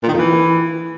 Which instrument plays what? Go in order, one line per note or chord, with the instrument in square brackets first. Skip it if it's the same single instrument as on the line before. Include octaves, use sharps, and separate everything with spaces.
[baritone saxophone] A#2
D#3
F2
E3